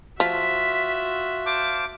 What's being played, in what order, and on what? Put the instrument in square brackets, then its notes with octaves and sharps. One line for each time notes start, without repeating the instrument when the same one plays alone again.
[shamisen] F3 [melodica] F4 [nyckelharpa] F#4 E5 [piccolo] B6
[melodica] C5 F5 A5 [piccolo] D6